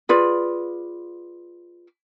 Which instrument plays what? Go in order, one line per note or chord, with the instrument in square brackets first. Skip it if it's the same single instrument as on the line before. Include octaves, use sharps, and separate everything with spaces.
[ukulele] F4 G#4 B4 D5